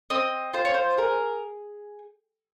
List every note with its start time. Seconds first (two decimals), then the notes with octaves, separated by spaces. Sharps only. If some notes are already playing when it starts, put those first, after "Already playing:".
0.10 C4 D#5
0.54 F4 C5
0.65 C#5
0.74 C5
0.97 G#4 A#4